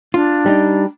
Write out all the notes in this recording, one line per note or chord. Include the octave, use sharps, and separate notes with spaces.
D4 F4
G3 D#4